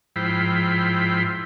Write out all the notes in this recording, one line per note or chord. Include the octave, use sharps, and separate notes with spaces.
G#2 F3 E4 C5 G5 B5